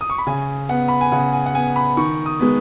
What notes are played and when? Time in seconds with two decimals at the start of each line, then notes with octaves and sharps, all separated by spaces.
0.01 D#6
0.10 C#6
0.18 B5
0.27 C#3 G#5
0.69 B3 F#5
0.88 B5
1.01 G#5
1.12 C#3 F#5
1.33 G#5
1.46 F#5
1.54 B3 G#5
1.76 B5
1.97 D#3 C#6
2.26 D#6
2.39 G#3 B3